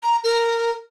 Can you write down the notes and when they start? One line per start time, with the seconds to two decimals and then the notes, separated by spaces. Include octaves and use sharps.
0.03 A#5
0.24 A#4